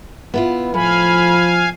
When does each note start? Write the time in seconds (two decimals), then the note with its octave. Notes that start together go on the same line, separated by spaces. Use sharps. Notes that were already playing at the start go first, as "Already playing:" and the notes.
0.34 B3 E4 F4
0.74 A2 F3 F5 G#5 B5